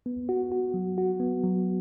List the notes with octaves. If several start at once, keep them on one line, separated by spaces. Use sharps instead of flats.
B3
F#4
F#4
F#3
F#4
B3
F#3